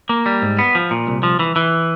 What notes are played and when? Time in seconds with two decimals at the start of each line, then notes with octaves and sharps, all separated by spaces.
0.09 A#3
0.26 G3
0.42 G#2
0.59 B3
0.75 F3
0.91 A#2
1.07 C2
1.23 F3
1.39 E3
1.56 E3